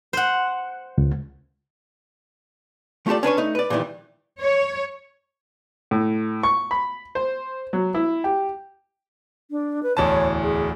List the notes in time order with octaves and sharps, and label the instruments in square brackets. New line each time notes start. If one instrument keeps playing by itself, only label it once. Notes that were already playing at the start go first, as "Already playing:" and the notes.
[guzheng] C5 F#5
[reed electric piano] C#2
[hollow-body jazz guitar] A3 F4 G4 A4 D5
C#4 D4 B4 C#5
A3 D#4
B4 D5
A#2 D#3 E3 G3
[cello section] C#5
[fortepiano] A2
C#6
B5
C5
F#3
E4
G4
[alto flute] D4
B4
[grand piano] D1 E2 A5 [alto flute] C#5
[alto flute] G#4